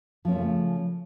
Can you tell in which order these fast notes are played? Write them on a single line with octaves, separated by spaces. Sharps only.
F3 C#4 C4 A3 C#3